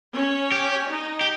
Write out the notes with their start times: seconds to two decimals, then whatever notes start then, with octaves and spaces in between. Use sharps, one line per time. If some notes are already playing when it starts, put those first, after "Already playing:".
0.14 C#4 C#5
0.52 G4
0.89 D#4 D#5
1.21 G4